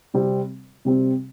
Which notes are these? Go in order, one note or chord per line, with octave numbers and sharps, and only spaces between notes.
C3 G3 C4
C3 G3 C4